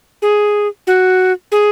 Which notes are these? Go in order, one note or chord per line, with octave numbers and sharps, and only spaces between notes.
G#4
F#4
G#4